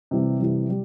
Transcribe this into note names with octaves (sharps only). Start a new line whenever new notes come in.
C3 E3 G3
C3 E3 G3
G3